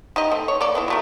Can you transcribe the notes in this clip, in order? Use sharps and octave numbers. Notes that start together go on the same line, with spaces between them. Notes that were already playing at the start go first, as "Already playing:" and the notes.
D#4 G4 D#5
A3 C4
C#5
A#3 A4 D5
B3 C4 E4
F#3 A3 A#4